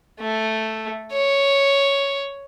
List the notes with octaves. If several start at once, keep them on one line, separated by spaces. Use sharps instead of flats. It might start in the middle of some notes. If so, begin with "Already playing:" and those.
A3
C#5